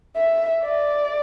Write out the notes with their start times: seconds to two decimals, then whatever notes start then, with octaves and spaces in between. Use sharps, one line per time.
0.17 E5
0.64 D5